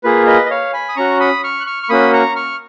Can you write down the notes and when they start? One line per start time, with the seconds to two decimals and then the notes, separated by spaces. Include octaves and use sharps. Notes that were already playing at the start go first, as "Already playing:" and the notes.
0.04 A#3 F4 G#4 B4
0.27 B4 D#5
0.45 D#5
0.50 C#5 F5
0.73 G#5 B5
0.89 D#6
0.96 C#4 F#4 A#5 C#6
1.20 B5 D#6
1.43 C#6 F6
1.61 F#6
1.66 C#6 F6
1.83 C#6
1.89 A#3 C#4 F#4 B5 D#6
2.13 A#5 C#6
2.36 C#6 F6